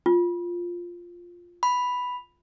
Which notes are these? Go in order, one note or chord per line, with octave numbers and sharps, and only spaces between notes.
F4
B5